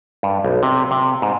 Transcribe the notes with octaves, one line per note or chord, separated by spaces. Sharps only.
G2
B1
C3
C3
G#2